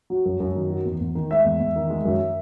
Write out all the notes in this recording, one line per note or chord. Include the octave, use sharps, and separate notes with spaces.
F#3
F#2
F#2
D#3
F#3
E2
E2
D#3
G#3 E5
E2
E2
D#3
G#3
F#2